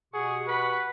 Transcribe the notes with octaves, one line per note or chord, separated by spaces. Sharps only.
B2 G4 G#4 F#5 C#6
B4 F#5 B5